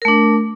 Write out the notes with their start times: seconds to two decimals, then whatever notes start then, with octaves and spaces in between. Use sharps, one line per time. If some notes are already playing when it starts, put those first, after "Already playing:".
0.02 A#4
0.05 A3
0.08 D4